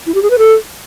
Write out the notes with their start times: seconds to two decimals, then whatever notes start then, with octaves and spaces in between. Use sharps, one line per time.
0.07 E4
0.14 G4
0.22 G#4
0.30 B4
0.38 A4